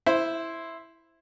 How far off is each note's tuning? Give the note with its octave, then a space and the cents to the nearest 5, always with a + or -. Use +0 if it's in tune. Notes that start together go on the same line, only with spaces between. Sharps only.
E4 +0 C5 +0